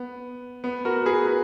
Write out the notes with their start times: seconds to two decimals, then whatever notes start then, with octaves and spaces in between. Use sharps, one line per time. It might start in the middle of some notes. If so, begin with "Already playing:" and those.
Already playing: B3
0.64 B3
0.85 F#4 A#4
1.06 G#4 B4
1.26 G#4 B4